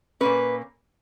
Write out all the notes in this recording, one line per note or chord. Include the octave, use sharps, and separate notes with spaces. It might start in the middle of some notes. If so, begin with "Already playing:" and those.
A#2 A#3 C#4 B4